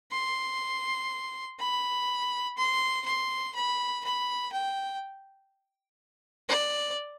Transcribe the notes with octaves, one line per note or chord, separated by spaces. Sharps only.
C6
B5
C6
C6
B5
B5
G5
D5